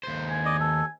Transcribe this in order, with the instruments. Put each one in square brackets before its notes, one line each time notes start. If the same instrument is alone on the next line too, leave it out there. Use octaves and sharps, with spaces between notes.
[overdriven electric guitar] D#2 C5
[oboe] G#5
[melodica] D5 D#5
A4